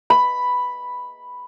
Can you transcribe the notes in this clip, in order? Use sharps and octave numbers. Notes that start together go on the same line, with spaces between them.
B5